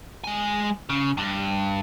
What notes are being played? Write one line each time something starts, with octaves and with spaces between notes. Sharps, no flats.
G#3 G#5
C#3
G2